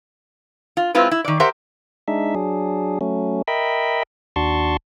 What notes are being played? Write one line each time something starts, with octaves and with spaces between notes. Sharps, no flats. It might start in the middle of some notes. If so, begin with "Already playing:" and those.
F4
G#3 C4 E4 F4 B4
E4
D#3 D5
G4 A#4 C5 E5 F#5
G#3 D4 D#4 E5
F#3 D4 G#4
F#3 A3 C#4
A#4 D#5 E5 G5 B5
D#2 D4 F#4 A5 C6 C#6